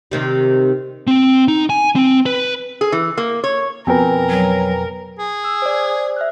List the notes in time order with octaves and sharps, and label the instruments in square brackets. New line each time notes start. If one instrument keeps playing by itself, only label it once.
[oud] C3 D#3 G3
[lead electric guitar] C4
D#4
G#5
C4
B4
[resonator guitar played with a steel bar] G#4
E3
A#3
C#5
[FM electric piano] F2 B2 [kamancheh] A#4 [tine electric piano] B4 G5 G#5
[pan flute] F#3
[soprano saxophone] G#4
[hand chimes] E6
C5 D5
E5 F6 F#6